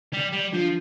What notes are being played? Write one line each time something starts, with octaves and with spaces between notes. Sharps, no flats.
G3
G3
F3 D4 F4